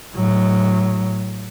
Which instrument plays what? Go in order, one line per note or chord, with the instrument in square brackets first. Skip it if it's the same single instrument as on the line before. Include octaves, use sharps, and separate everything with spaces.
[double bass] A2 F#3